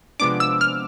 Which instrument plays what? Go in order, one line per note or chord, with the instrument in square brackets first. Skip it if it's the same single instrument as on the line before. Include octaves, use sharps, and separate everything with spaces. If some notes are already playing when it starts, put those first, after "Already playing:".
[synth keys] C3 F3 G#3 B3 D4 [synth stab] D6
[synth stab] E6
F6